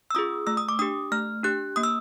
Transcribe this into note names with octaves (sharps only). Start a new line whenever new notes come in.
E6
C#4 F4 G#4 D#6
A3 E6
D#6
D6
D4 G4 D#6
A3 F6
D4 G4 F#6
A#3 D#6
E6